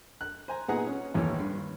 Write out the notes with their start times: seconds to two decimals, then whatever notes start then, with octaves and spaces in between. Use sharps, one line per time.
0.21 F#6
0.48 C5 G#5 A#5
0.68 A#2 B3 D#4 G#4 F#5 A#5
0.87 C#4
1.14 A1 D#2 D#3 E3 C#5
1.39 G2